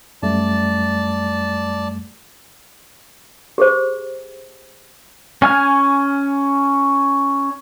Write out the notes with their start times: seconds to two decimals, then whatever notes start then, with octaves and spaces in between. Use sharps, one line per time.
0.23 F#2 G3 A3 D5 A5
3.58 G4 G#4 C5
5.42 C#4 G#5 F6